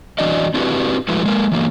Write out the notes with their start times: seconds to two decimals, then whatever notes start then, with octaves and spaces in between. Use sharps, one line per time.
0.18 E3 F#3 D4 F#4 D5 D#5
0.54 C4 D4 E4 F#4 G4 B4
1.09 F3 G#3 A3 E4 F#4 B4
1.26 G#3 A#3 A#4
1.52 E3 F#3 A#3